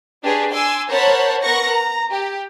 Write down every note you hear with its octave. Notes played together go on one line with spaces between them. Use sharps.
D4 G4 G#4 B4 C#5
G#5 C6 D6 E6
A#4 C5 C#5 F#5 A5 B5
B3 A#4 F#5 C#6 A#6 C#7
A#5
G4